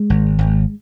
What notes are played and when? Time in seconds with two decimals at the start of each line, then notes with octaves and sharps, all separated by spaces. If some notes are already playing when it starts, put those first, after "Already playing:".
Already playing: G#3
0.10 G#1
0.38 G#1